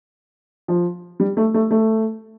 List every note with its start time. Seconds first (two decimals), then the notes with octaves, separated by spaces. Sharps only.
0.68 F3
1.20 G3
1.37 A3
1.54 A3
1.71 A3